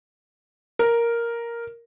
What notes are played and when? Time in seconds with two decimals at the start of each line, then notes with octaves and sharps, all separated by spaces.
0.79 A#4